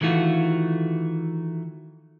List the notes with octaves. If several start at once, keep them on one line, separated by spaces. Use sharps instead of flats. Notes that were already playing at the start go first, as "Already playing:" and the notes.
D#3 E3 A3 F4 F#4